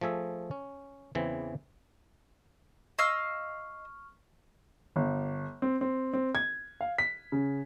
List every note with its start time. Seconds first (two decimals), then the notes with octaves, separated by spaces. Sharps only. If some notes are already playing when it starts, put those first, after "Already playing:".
0.01 F3 A3 G#4 E5
0.51 C#4
1.15 E2 C#3 E3 C4
2.99 D#5 F5 C#6 E6 F6
4.96 G1
5.62 C4
5.81 C4
6.13 C4
6.35 G#6
6.81 F5
6.98 B6
7.32 C#3